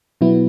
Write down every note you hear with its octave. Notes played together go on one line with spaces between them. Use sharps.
B2 F#3 B3 E4